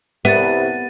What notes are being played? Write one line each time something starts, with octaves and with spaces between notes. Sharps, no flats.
C2 B3 G4 E5 A6 D#7